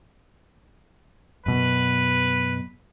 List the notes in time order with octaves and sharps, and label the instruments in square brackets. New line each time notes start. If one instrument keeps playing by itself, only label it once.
[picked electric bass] F#2 B2 [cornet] B4